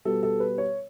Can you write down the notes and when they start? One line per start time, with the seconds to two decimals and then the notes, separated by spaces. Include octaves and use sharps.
0.05 B2 G3 B3 A4
0.23 A4
0.40 B4
0.58 C#5